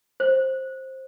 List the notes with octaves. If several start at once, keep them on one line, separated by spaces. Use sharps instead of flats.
C5